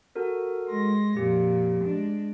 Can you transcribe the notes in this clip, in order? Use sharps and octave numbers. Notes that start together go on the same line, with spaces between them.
F#4 A4 A#4
G#3 C6 A#6
F2 A#2 G4
G#3 D4